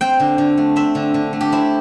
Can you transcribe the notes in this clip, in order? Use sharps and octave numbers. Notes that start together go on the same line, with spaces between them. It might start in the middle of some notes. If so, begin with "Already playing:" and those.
C4 G5
D3
D3
A3
C4 E5
D3
D3
A3
G4
C4 E4